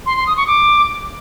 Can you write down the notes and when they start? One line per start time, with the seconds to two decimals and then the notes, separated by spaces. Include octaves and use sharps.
0.06 C6
0.16 C6
0.27 D#6
0.37 C#6
0.47 D6